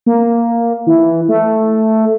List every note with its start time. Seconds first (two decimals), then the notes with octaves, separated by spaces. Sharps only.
0.06 A#3
0.86 E3
1.29 A3